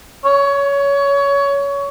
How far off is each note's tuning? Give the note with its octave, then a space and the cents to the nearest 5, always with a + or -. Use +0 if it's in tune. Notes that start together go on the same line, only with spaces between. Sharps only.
C#5 +20